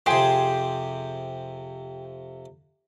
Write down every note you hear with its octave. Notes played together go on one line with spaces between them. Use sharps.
F2 C3 G4 G#4 C5